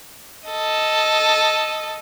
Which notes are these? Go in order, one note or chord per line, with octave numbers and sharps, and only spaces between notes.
A4 D#5